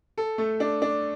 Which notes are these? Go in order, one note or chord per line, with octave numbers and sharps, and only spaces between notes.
A4
A3
D4
D4